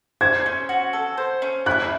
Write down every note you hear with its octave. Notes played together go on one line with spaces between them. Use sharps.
C5 G#6
C#4
F#4
A4
C5
C#4
E4 F#6